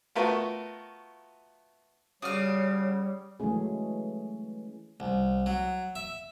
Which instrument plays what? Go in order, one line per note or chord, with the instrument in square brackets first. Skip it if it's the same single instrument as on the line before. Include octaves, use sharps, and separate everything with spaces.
[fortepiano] A3 B3 F4 F#4 A#4 B4
[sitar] C#3 F#4 D5 [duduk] G3 [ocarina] C#5 [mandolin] D#6 F6
[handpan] E3 F#3 G#3 A3 C#4 G#4
[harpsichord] C2
F#3
E5